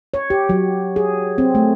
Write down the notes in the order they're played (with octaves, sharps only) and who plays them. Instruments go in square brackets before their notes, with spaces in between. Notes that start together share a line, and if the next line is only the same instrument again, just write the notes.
[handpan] C#5
G4
F#3
G#4
C4
A3